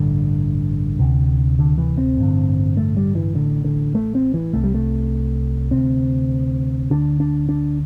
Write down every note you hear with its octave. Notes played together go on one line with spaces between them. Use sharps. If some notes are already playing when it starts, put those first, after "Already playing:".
Already playing: A1 G2 D3
D2 C3
D3
E3
C4
A1 G2 D3
A3
G3
E3
A1 A2 D3
D3
A3
C4
E3
C2 C3 A3
G3
A3
D2 C3 C4
D2 D3 D4
D4
D4